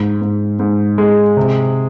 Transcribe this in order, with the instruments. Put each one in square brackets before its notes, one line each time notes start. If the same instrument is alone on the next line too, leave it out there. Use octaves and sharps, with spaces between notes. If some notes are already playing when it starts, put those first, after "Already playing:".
Already playing: [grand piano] G#2
G#2
G#2
G#3
C3